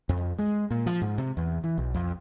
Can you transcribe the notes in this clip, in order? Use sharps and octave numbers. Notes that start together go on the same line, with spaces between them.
F2
G#3
A#2
F3
G#2
C3
E2
E3
B1
F2